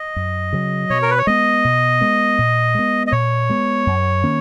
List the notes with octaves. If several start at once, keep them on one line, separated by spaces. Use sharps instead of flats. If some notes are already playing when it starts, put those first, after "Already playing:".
Already playing: D#5
F#2
C#3 F#3
B2 C#5
A#4
B4
C#5
G#3 B3 D#5
B2
G#3 B3
A#2
G#3 B3
D#5
A#2 C#5
G#3 B3
F#2
D#3 A#3 C#4